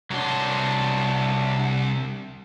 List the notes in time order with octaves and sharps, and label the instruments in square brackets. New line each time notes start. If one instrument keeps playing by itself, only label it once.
[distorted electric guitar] C2 C6 [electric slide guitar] F#3 D4